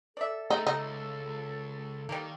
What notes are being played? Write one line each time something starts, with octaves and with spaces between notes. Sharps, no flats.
A4 D5 E5
A3 D#4 G#4
C#2 D#4
D#3 G3 A#3